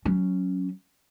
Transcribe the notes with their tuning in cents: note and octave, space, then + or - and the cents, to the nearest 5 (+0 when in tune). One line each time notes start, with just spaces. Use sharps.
F#3 +0 C#4 +0